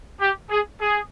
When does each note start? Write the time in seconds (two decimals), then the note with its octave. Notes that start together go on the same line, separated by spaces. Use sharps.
0.20 G4
0.50 G#4
0.80 G#4